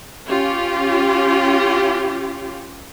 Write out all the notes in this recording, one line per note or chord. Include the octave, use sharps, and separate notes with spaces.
C#4 F4 G4